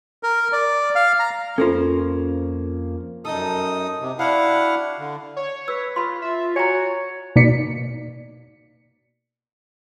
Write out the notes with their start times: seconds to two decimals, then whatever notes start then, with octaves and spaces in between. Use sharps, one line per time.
0.23 A#4
0.53 D5
0.95 F5
1.19 A#5
1.58 F2 F3 A#3 C#4 F4 A4 A#4 C5
3.25 F#2 D#4 A4 D#5 D#6
4.00 C3
4.19 D4 E4 F#4 F5 F#5
4.99 D3
5.36 C#5
5.68 B4 E6
5.96 F4 B5 C6
6.22 F4 E5
6.56 F#4 C#5 G#5 A#5
7.36 B2 A#3 D#4 D5 B6 C#7